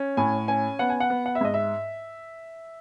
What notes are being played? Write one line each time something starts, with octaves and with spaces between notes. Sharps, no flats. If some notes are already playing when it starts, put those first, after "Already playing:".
Already playing: C#4
A2 G#5
C#4 G#5
B3 F#5
G#5
F#5
B3
F#5
E5
G#2 D#5
E5